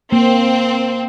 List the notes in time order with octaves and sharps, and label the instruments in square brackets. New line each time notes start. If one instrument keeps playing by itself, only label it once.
[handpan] A#3 [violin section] C4